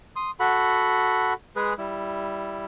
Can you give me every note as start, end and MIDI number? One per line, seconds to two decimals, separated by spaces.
0.16 0.31 84
0.16 0.31 87
0.40 1.33 66
0.40 1.33 69
0.40 1.33 78
0.40 1.33 83
1.56 1.74 56
1.56 1.74 68
1.56 1.74 71
1.78 2.66 55
1.78 2.66 64